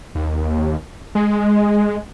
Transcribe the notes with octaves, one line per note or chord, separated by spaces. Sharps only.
D#2
G#3